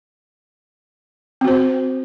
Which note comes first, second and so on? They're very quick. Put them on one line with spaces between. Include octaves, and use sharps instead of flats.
C4 F#4 C5